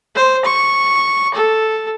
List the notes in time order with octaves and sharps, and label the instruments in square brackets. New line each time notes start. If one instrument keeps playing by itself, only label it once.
[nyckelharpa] C5
C#6
A4